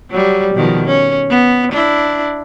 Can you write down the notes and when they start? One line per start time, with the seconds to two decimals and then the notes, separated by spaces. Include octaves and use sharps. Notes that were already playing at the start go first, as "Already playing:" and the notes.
0.11 F#3 G3
0.55 B2 D#3 F3
0.86 C#4
1.30 B3
1.72 D4 E4